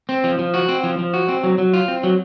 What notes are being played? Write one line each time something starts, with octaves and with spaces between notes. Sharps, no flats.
C4
F3
F3
F#4
C4
F3
F3
F#4
C4
F#3
F#3
F4
C4
F#3